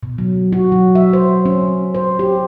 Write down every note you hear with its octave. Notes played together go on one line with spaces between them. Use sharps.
B2
F#3
F#4
F#3
E5
C5
C#4
C5
G4